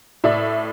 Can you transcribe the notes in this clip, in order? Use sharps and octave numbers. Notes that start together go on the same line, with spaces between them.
A2 D5 E5